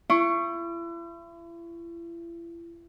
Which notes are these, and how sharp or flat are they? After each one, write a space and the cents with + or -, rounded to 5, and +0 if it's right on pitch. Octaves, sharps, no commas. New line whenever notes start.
E4 +40 C#6 +0